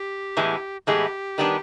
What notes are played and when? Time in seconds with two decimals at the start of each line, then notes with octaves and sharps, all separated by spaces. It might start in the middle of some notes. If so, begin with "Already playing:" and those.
Already playing: G4
0.37 A2 E3 G#3 B3
0.87 A2 E3 G#3 B3 G4
1.38 D#3 G3 B3 D4